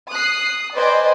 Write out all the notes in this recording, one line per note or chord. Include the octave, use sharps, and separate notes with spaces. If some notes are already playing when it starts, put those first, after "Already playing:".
D#6 F#6 C7
B4 C5 D5 D#5 G5 G#5